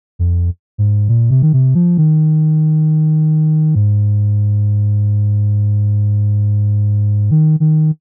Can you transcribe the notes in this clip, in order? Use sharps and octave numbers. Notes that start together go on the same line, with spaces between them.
F2
G#2
A#2
C3
D#3
C3
F3
D#3
G#2
D#3
D#3